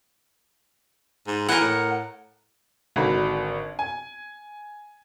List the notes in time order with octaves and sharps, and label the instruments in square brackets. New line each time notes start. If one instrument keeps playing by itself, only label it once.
[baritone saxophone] G#2
[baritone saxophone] E3 [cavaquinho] A#4 F#5
[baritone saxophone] A2
[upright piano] G#1 D3 F#4 B5
G#5